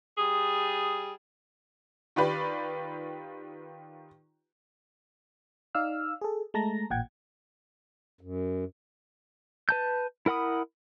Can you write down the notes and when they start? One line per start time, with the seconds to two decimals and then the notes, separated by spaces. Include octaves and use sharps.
0.17 G3 G#4
2.16 D#3 F4 G4 B4 D5
5.75 D#4 D5 F5 E6 F6
6.21 G#4 A4
6.54 G#3 A3 A5 A#5 A#6
6.90 A1 A#2 F#5 G5 G#6
8.21 F#2
9.69 B4 A5 G6
10.26 E4 A#4 F#5 B5 D#6